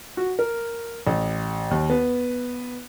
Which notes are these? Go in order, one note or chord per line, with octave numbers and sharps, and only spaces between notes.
F#4
A#4
A1
D#2
B3